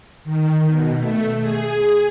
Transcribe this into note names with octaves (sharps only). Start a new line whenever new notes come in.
D#3
B2
A3
G#4